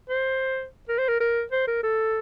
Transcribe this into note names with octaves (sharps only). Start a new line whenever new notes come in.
C5
A#4
C5
A#4
A#4
C5
A#4
A4